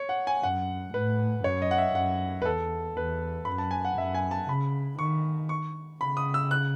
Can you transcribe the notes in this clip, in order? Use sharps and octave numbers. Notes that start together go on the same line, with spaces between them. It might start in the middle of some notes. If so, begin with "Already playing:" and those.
Already playing: C#5
F#5
G#5
F#2 F#5
A2 B4
F#2 C#5
D#5
F#5
E5
F#2 F#5
B4
E2 A4
E2 B4
F#2 B5
A5
G#5
F#5
F#2 E5
G#5
A5
C#3 B5
D#3 C#6
C#6
C#3 B5
D#6
E6
F#6